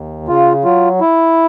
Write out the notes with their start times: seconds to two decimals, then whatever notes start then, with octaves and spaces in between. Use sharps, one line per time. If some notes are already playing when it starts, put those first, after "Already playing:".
Already playing: D#2
0.28 C#3 F4
0.64 F#3 F4
1.00 E4